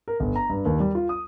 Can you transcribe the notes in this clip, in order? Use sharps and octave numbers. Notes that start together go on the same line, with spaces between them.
A#4
G1
A#5
G2
D#2
G3
F4
D#6